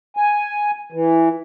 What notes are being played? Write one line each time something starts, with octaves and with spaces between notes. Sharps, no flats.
G#5
E3